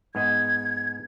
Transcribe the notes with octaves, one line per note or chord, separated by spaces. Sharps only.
G#2 B3 D#5 G#6